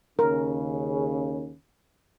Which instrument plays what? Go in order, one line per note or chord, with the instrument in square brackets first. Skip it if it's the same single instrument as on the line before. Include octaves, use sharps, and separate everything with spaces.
[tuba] D#2 [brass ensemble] C#3 [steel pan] A#4